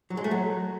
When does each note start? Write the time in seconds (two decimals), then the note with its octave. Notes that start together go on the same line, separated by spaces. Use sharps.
0.10 F#3
0.17 G#3
0.24 A3
0.31 F#3